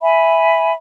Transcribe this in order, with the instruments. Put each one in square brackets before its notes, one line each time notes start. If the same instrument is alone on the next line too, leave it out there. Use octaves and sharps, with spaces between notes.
[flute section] E5 G#5 B5